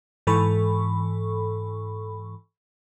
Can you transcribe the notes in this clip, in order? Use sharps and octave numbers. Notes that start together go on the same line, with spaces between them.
G#2 E3 A4 B5 C#6